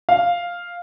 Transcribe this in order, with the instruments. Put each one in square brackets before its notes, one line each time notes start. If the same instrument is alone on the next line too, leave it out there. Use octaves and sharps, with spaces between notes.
[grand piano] F5